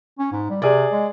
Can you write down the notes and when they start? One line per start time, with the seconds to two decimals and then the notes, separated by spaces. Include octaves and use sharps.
0.19 C#4
0.32 G#2
0.50 G3
0.62 C3 G#4 D5
0.92 G#3